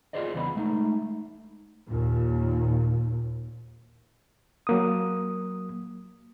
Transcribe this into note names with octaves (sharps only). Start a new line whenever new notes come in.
F4 F#4 G#4 C5 D5 D#5
E2 C#3 B3 B5
G#3 A3 D#4
D#2 A#2
F#3 A#3 D#6